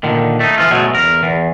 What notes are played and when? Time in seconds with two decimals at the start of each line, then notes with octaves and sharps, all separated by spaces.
0.03 A#2 D3 D#3
0.40 A3 D#4
0.58 E3 F3 F4
0.71 B2 F#3 G#3 A3
0.95 E2 A#4
1.23 E2